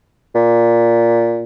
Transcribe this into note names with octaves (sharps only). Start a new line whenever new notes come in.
A#2